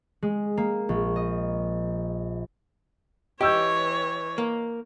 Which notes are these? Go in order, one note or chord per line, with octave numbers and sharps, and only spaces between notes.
G#3
A#3
A#1
D#5
E3 G4 C#5 D#5 E6 G6
A#3